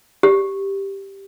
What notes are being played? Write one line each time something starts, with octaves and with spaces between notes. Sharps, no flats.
G4